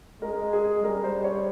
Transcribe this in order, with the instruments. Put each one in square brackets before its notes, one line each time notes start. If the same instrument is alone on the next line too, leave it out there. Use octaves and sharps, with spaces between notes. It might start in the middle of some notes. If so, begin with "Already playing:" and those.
[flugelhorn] G#3 [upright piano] A#4
[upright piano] G#4
[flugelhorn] G3 [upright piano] A#4
[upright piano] C5
C#5